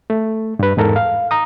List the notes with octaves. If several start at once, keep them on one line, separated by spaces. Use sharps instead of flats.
A3
G2 B4
E2 G#2 A4 A#4
F5
A#5 D#6